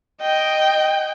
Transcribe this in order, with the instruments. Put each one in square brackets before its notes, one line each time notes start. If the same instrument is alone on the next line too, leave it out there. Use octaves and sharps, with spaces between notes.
[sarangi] D#5 [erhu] G5